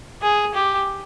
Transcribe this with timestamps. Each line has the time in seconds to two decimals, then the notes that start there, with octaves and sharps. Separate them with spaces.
0.22 G#4
0.55 G4